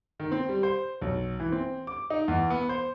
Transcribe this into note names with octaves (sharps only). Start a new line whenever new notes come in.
D#3
C4
G3
C5
B1
E3
C4
D6
D#4
E2
B3
C5